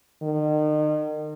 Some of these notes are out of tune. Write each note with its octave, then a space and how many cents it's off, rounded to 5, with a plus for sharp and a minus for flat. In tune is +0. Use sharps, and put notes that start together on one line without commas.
D#3 -35